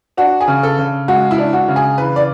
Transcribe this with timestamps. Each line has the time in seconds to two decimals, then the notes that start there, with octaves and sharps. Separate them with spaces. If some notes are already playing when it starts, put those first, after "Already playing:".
0.17 D4 F#4
0.41 G#4
0.48 C#3
0.63 A4
0.78 C#3
1.08 G#3 F#4
1.31 E4
1.38 D4
1.53 F#4
1.68 C#3
1.76 G#4
1.98 E3 B4
2.16 D5